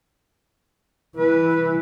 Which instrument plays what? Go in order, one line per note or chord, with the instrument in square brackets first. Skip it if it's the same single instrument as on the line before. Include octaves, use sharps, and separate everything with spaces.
[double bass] E3 [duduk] B4